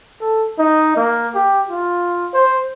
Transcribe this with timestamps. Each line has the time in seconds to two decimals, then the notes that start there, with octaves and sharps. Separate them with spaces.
0.21 A4
0.59 D#4
0.97 A#3
1.35 G4
1.70 F4
2.34 C5